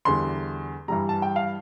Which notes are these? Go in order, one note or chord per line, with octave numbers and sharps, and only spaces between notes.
E2 D3 G3 C6
G2 E3 G3 A#5
A5
G5
F5